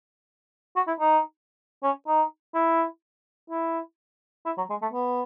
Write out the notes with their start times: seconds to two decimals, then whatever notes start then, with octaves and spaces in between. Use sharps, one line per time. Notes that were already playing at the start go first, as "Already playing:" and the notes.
0.76 F#4
0.88 E4
1.00 D#4
1.83 C#4
2.08 D#4
2.55 E4
3.50 E4
4.46 E4
4.58 F#3
4.70 G#3
4.82 A3
4.94 B3